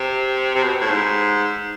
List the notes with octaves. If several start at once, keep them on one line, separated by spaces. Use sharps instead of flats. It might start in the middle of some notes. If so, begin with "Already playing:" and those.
Already playing: C3
C3
B2
A2
G#2